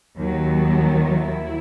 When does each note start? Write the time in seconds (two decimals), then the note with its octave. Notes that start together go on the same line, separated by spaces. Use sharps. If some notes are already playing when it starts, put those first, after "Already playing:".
0.18 D#2 D#3 F#3
1.01 E4